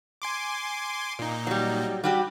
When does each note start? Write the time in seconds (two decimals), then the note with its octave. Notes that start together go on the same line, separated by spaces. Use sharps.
0.22 G#5 C6 D6
1.19 A#2 D#4
1.47 F#3 G3
2.04 G3 F#4 G4